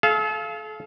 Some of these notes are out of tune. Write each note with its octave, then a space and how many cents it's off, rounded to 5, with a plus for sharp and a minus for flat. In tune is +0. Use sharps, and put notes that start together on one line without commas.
A4 -40 F5 -20